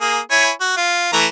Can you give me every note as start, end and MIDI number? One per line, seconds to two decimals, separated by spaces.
0.01 0.19 58
0.01 0.19 68
0.31 0.50 64
0.31 0.50 73
0.31 0.50 80
0.60 0.76 66
0.77 1.08 65
1.13 1.26 52
1.13 1.26 57
1.13 1.26 82